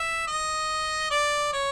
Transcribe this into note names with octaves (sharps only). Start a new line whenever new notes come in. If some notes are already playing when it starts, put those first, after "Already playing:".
Already playing: E5
D#5
D5
C#5